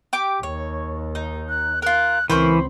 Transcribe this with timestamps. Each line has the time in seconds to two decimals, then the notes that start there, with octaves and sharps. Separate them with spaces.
0.13 G4 D6
0.43 D#2 C#5
1.15 D#4
1.49 F#6
1.82 F4 A#4 F#6
2.30 C#2 E3 C4 A#4 C5 B5 C#6